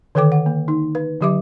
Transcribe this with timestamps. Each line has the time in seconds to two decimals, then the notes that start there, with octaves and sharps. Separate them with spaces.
0.15 D3 D#3 A4 B4 G5 D6
0.32 F#5
0.46 A#3
0.68 D#4
0.95 B4
1.21 D3 F#3 G4 E5 D6